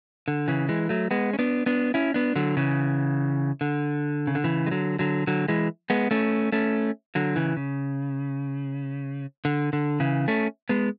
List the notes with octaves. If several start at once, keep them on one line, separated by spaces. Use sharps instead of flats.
D3
C#3 E3
E3 G#3
F#3 A3
G#3 B3
C#4
B3 D4
B3 D4
C#4 E4
B3 D4
D3 F#3
C#3 E3
D3
C#3
D3
C#3 E3
G#3
D3 F#3
D3 F#3
D3 F#3
E3 G#3
G#3 B3
A3 C#4
A3 C#4
D3 F#3
C#3 E3
C#3
D3
D3
C#3 E3
A3 C#4
G#3 B3